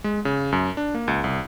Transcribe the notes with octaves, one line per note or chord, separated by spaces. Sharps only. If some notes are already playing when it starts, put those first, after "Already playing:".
G#3
C#3
F#2
D4
A#3
C#2
C2